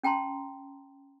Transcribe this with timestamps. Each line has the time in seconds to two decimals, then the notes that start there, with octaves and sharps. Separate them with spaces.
0.03 C#4 G5 A5 A#5 C6